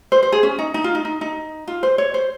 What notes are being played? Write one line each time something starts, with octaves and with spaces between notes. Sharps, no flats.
C5
C5
G#4
C#4
D#4
D#4
F4
D#4
D#4
D#4
F4
C5
C#5
C5